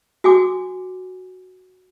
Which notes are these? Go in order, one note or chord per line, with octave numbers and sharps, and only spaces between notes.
F#4 G#5 D6